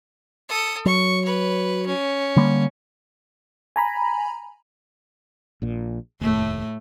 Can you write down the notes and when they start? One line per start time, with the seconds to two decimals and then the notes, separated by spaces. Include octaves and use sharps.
0.49 A4 D#6
0.86 F#3 C#6
1.25 B4 C#5
1.87 C#4
2.36 D3 G3 A#3
3.76 G#5 A#5 B5
5.62 A#1 A#2
6.21 F1 D#2 A2 A3